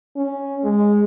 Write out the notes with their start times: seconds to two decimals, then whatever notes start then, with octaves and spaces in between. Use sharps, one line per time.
0.16 C#4
0.64 G#3